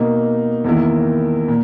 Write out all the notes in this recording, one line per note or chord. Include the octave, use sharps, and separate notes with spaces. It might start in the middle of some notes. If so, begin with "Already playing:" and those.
Already playing: B2 A#3 D#4
E2 D#3 A#3 E4
A#2